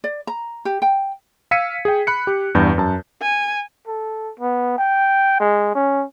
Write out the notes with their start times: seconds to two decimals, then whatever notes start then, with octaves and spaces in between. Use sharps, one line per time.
0.04 D5
0.27 A#5
0.65 G4
0.82 G5
1.51 F5 E6 G#6 B6 C#7 D#7
1.85 G#4 G5
2.07 B5 F#6 C#7
2.27 G4
2.55 E2 G2 G6
2.78 F#2 A5
3.22 G#5
3.87 A4
4.39 B3
4.78 G5
5.40 G#3
5.75 C#4